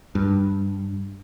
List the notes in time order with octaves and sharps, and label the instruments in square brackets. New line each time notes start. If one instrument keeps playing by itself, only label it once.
[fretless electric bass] G2